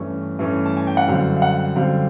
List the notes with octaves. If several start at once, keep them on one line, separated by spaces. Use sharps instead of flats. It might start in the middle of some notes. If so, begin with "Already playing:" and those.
Already playing: G2 E3 A3 C#4
G2 E3 A3 C#4
A5
G#5
G5
F#5
F#2 D3 G3 C4 F5
F5
F#5
F#2 D3 G3 C4 F5